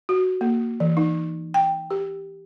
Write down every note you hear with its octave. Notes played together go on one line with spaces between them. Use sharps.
F#4
A#3
E3
D#4
G5
G4